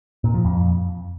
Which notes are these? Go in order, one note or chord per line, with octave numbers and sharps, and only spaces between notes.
A#2
F3
F2